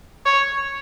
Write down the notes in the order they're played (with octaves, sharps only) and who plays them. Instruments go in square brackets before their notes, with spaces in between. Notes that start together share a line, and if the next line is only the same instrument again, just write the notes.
[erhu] C#5